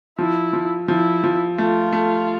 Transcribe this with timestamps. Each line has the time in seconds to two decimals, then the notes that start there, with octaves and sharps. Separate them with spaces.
0.18 F3 E4
0.53 F3
0.88 F3 E4
1.24 F3
1.58 A3 F4
1.93 A3